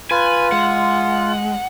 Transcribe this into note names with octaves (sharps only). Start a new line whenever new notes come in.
F4 B4 G#5
G#3 F#5